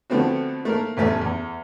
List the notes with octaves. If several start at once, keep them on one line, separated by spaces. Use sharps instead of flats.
D3 F3 A3 B3 C4 F#4
A3 A#3 A#4
A1 E2 A3
E2